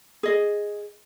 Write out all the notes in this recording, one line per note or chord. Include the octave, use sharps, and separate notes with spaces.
G#4 D#5